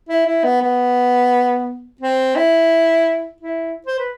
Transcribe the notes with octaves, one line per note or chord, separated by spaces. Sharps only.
E4
E4
B3
B3
C4
E4
E4
C5
B4